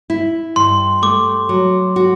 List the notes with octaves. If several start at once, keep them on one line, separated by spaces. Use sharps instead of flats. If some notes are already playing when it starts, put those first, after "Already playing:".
E4
G2 C6
A3 D6
F#3
F#4